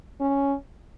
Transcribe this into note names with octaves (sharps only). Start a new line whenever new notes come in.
C#4